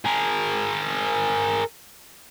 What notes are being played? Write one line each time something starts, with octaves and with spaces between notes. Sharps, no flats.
G#4 A#4